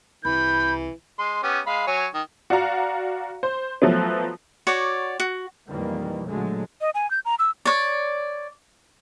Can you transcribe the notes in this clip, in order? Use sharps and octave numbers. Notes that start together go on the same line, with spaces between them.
C2 E3 B5 G6
G#3 C6
B3 C#4 G4
G#3 F5 B5
F#3 C#5 G#5
D#3
F#4 D5 F5 A#5
C5
F3 F#3 A3 B3
F#4 C#5 D5
F#4
B1 F2 D#3 E3 G3 A#3
A#2 D3 F#3 G#3 A3
D#5
G#5
G6
A#5
E6
C#5 D5